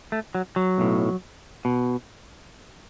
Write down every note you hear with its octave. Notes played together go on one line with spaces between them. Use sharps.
A3
F#3
F#3
B1 A2
B2